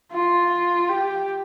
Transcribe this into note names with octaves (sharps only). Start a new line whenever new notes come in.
F4
G4